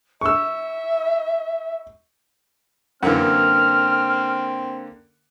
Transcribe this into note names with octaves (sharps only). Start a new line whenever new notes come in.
E5 C#6 E6
F#2 D3 E3 A#3 C4 F#5 F6